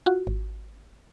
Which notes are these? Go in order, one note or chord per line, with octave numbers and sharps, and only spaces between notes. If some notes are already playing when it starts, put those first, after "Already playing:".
F4 F#4
G#1